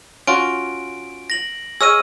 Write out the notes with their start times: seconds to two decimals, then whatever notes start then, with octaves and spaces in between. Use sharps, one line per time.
0.27 C#4 F4 F#4 D7
1.30 A#6 F#7
1.81 G#4 C#5 D#5 E6 F6 D#7